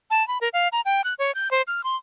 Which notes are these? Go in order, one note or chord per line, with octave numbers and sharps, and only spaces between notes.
A5
B5
A#4
F5
A#5
G5
F#6
C#5
G6
C5
F6
C6